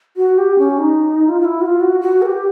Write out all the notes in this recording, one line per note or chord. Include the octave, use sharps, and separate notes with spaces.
F#4
G4
C#4
D#4
F4
F4
E4
F#4
F4
F#4
F#4
B4
G4